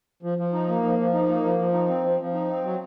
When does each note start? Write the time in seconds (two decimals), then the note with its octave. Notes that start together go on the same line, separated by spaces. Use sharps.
0.23 F3
0.38 F3
0.53 D#4
0.68 A#3
0.83 F3
0.98 F3
1.13 D#4
1.28 A#3
1.43 F3
1.59 F3
1.73 D#4
1.89 C4
2.04 F3
2.19 F3
2.34 D#4
2.49 C4
2.64 F#3